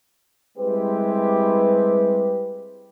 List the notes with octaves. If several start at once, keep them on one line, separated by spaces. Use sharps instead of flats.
G3 G#3 C4 E4 G4 B4